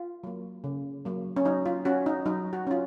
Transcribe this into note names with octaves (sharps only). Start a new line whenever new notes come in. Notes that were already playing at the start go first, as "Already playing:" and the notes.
Already playing: F4
F#3 A#3
C#3
F#3 A#3
C#4
F#3 D#4
F4
C#4 F#4
D#4
F#3 D#4
F#4
C#4 F4